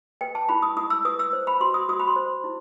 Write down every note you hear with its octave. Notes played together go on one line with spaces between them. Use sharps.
B4 G5
A5
E4 B5
D#6
E4 D#6
E6
B4 D#6
E6
C5
B5
F#4 C6
D#6
F#4 D#6
B5
C6
C5
E4